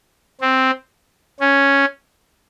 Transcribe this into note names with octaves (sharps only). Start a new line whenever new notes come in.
C4
C#4